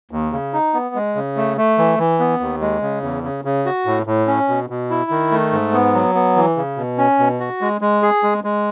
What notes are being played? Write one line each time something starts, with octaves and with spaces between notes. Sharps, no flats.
D#2
C#3
D#4
B3
G#3
C#3
A3
A3
E3
E3
B3
D#2
G#3
C#3
E2
C#3
C#3
F#4
A2
A2
C#4
B2
B2
E4
D#3
A3
G#2
B3
F#3
B3
E3
C#3
B2
C#4
B2
F#4
G#3
G#3
G#4
G#3
G#3